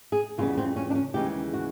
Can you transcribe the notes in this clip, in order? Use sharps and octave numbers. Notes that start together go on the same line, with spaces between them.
G#4
F2 C#3 E3 G3 B3 F4
C4
C#4
D4
C#4
D#2 C#3 E3 G#3 G4
F#4